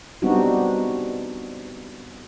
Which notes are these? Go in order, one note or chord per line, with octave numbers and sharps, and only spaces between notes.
G3 B3 C4 D4 D#4 F#4